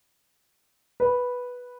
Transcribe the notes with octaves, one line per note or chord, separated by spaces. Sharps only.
B4